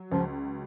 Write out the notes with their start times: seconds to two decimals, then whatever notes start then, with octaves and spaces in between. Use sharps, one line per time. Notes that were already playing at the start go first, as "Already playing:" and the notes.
Already playing: F#3
0.11 C#2 F3